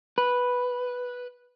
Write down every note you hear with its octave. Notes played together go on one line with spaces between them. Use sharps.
B4